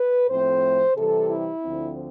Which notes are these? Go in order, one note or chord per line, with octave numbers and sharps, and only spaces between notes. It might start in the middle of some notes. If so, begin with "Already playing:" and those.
Already playing: B4
A2 F3 A3 C4 C5
C3 E3 G3 A4
E4
D2 D3 F3 C4